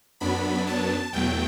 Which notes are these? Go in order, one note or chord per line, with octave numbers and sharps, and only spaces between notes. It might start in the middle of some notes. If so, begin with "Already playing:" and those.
F#2 F#3 B3 D4 B5
A5
E2 B2 F#3 A3 G5